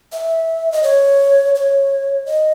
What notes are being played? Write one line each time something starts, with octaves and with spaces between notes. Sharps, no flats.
E5
D#5
C#5
C#5
D#5